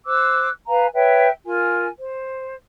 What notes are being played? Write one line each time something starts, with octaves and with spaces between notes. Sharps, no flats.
C5 D6 E6 F#6
B4 F5 G#5 A#5
B4 C#5 E5 G5
F4 A#4 G#5
C5